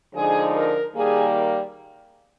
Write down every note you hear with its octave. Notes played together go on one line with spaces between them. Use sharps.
D3 F3 G#3 D#4 G#4
A#4
D#3 G3 A#3 G#4